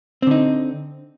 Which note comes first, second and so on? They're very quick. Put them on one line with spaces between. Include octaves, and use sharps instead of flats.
C4 D3 D#4